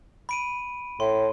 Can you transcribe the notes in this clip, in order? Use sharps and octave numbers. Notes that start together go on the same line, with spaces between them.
B5 D7 D#7
A2 C6